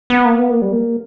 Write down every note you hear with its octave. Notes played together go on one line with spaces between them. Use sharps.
B3
A#3
B3
A#3
G3
A#3